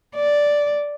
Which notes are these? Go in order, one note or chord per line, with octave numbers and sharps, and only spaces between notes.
D5